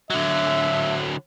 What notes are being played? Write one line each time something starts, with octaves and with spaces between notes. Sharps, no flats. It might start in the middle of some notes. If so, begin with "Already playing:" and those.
D3 F#3 E5